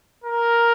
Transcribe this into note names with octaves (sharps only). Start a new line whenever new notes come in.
A#4